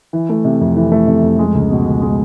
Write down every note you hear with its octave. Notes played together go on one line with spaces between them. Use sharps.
E3
A3
C3
F2
E3
A3
C3
F2
G#3
C#2
B2
C#2
G#3